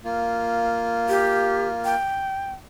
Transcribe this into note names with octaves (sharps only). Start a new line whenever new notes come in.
A#3 F4
G4
G5